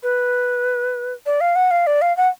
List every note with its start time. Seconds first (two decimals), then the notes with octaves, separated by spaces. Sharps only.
0.03 B4
1.26 D5
1.41 F5
1.56 F#5
1.71 F5
1.87 D5
2.02 F5
2.17 F#5